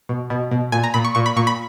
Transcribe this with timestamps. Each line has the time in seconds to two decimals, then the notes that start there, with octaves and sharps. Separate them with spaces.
0.09 B2
0.30 B2
0.51 B2
0.72 A#2 G#5
0.84 A#5
0.94 A#2 B5
1.05 C#6
1.15 A#2 C#6
1.26 B5
1.36 A#2 C#6
1.47 B5